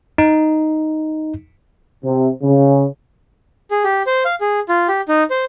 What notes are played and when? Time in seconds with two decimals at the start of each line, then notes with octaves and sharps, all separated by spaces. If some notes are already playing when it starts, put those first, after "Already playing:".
0.18 D#4
2.04 C3
2.43 C#3
3.71 G#4
3.84 G4
4.07 C5
4.25 F5
4.41 G#4
4.69 F4
4.88 G4
5.09 D#4
5.30 C5